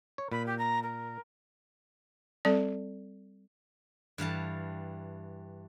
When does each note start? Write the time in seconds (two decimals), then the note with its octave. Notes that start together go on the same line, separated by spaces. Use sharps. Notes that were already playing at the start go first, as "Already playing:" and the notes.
0.18 C#5
0.32 A#2 B5
0.46 G4
0.58 A#5
0.83 A#4
2.45 G3 C4 A4 D5
4.18 G2 E3 F5 A5